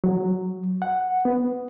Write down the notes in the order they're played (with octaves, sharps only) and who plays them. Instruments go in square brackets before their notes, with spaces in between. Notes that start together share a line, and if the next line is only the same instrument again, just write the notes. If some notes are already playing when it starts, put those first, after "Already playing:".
[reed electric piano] F#3
F#5
B3